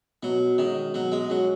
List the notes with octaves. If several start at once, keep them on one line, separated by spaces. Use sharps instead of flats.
B2 F#3
D#3 G#3 C#4 F#4
B2 F#3
G#3
F#3 G#3 C#4 F#4